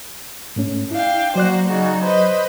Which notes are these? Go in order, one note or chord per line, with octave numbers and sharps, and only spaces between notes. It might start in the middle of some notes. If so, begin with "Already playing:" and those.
G#2 A3 C#4
D4 E4 F5 G5
F#3 A#3 F#4 C5 D5 F#6
C#3 D#4 F#4
B4 C5 D#5